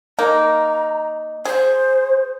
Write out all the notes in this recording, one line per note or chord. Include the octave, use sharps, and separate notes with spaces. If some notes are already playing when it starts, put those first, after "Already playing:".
A#3 D#4 A#5
G#4 C5